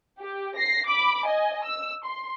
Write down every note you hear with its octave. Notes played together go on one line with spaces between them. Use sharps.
G4
A#6 C7
B5 D6
D#5 G#5
E6
C6